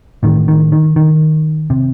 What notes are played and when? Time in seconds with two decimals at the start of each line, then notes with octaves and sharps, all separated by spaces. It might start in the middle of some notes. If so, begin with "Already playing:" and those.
0.23 A1 A2 D#3
0.48 D#3
0.72 D#3
0.96 D#3
1.70 C3